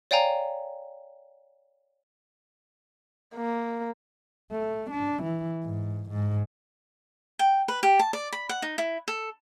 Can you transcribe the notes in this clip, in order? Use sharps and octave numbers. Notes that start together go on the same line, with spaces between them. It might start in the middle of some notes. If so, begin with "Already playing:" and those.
C#5 D5 F5 G5 G#5 A#5
A#3
A3
D4
E3
G#2
G#2
G5
B4
G4
A5
D5
B5
F#5
D#4
E4
A4